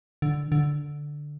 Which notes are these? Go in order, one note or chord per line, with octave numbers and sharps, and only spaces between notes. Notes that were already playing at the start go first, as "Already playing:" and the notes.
D3
D3